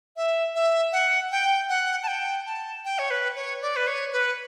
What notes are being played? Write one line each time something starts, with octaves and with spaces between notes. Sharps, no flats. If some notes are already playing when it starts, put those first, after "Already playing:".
E5
E5
F#5
G5
F#5
A5
G5
A5
G5
C#5
B4
C#5
D5
B4
C#5
B4